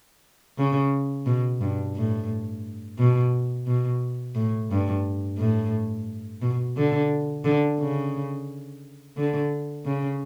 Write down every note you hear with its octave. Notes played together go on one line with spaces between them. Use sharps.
C#3
B2
G2
A2
B2
B2
A2
G2
A2
B2
D3
D3
C#3
D3
C#3